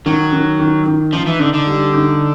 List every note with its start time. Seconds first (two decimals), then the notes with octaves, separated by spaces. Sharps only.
0.06 D#3 F#3
0.33 D#3
0.60 D#3
0.86 D#3
1.13 F3 D#4
1.27 E3
1.40 D3 D#4
1.54 D3
1.67 G3
1.93 D#4